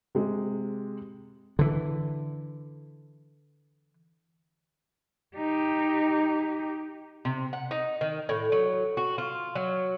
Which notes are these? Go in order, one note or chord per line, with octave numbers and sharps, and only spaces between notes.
C3 G#3
D3 E3
D#4 G4
C3
F#5
D#4
D#3
A2
F#3
F#4
F4
F#3